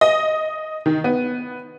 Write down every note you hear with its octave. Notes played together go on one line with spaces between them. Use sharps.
D#5
D#3
B3